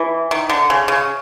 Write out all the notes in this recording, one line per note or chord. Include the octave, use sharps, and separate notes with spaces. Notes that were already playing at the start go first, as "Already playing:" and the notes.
Already playing: E3
D#3
D3
C#3
C#3